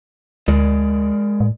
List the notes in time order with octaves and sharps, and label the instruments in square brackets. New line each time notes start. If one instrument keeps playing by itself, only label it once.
[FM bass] D2 [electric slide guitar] G#3 A#4 D5
[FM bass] A2